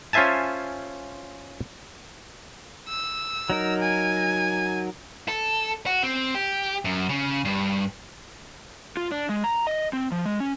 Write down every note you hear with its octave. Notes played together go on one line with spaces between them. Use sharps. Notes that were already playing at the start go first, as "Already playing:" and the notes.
C#4 F4 C5 E5 G#5 A5
E6
F#3 D#4 A#4
G#5
A4
F#4
C4
G4
F#2
C#3
G2
F4
D4
G#3
A#5
D#5
C4
F3
G#3
C#4